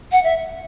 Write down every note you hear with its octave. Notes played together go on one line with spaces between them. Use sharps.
F#5
E5